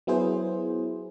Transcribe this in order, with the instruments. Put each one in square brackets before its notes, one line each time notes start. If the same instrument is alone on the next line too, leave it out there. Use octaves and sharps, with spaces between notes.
[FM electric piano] F#3 B3 E4 G#4 C5